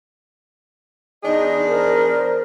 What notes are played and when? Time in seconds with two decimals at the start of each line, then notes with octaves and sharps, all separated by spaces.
1.24 E2 D4 D#4 G#4 D#5
1.68 A#4 C5 D5